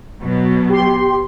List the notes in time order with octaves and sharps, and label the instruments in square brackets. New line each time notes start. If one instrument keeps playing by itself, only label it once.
[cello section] B2 F#3
[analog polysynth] G4 C6